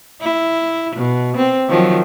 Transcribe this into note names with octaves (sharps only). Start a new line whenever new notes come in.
E4
B2
C4
D#3 F3 F#3